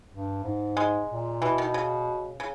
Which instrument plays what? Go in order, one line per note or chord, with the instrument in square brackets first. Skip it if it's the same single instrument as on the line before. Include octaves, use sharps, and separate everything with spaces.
[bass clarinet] G2
G#2
[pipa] G#3
[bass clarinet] A#2
[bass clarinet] B2 [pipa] E3
[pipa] D#3
C#3
C#3